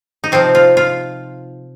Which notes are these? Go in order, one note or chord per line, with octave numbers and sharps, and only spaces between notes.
D#4
C3 F3 C4
F4
F4